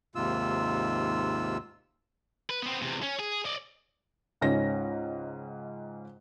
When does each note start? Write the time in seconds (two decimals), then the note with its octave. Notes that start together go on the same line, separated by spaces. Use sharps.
0.15 D#2 G#2 C3 F4 E6
2.50 B4
2.62 B3 C4
2.82 E2 C3
3.03 C#4
3.19 G#4
3.45 D5 D#5
4.41 C#2 G#2 C#4 A#6